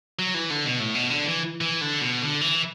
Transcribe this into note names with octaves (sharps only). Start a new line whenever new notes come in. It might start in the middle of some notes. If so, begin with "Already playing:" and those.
F#3
E3
D3
B2
A2
B2
D3
E3
E3
D3
B2
D3
E3